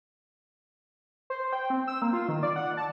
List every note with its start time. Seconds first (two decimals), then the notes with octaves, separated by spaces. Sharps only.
1.30 C5
1.53 G5
1.70 C4
1.87 E6
2.02 A#3
2.13 F4
2.29 D#3
2.43 D5
2.56 F#5
2.77 A5